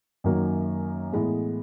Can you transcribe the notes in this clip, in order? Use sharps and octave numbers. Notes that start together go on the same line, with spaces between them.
F#2 D#3 F#3 A#3
A2 E3 G#3 B3